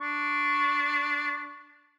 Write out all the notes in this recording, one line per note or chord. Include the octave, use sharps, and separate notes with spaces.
D4 C#6